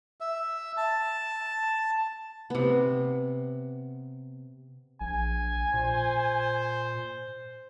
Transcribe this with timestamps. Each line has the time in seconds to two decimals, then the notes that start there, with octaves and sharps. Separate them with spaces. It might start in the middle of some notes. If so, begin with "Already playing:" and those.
0.20 E5
0.77 A5
2.50 C3 B3
5.01 A#1 G#5
5.74 A#2 C5